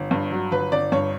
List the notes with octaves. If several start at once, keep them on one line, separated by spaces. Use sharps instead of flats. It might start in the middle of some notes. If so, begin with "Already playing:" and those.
Already playing: G1
G2
F#3
G1 B4
G1 D5
G2 C#5